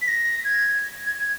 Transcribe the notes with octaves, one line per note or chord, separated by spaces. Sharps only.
B6
A#6
G#6
G#6